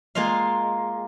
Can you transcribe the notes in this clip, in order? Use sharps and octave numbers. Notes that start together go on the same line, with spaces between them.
G#3 A#3 F4 D#5 F5